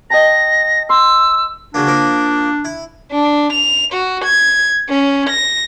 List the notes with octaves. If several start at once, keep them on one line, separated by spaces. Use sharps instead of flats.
D#5 G5 A5 A#6
C6 E6
C#3 F#3 A#3 D4
F3 A#3 A#4
E4
D4
F7
F#4
G#6
C#4
A#6